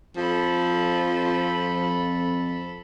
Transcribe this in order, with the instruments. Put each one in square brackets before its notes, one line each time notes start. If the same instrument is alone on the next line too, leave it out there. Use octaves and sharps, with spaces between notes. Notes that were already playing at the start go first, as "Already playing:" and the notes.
[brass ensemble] F2 [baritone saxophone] F3 [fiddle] A4 B5